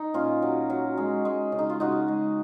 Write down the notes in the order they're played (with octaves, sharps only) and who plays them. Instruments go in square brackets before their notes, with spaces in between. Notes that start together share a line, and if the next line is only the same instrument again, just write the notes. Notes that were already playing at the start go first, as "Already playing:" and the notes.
Already playing: [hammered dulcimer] D#4
A#2 C#4 F4
F#3
F#3
G#3
G#3
C#3
D#4
F4
C#3 D#4 F#4
G#3